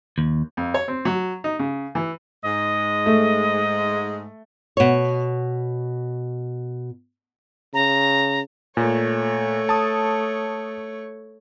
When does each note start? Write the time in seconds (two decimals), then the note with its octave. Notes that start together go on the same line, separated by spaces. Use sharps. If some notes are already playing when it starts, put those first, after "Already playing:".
0.18 D#2
0.57 F2
0.74 C#5
0.88 C4
1.05 F#3
1.44 D#4
1.59 C#3
1.95 E3
2.45 G#2 G#3 D#5
3.06 A3
4.77 B2 C#5
7.74 C#3 A#5
8.77 A#2 A3 C#5
9.69 A5 D#6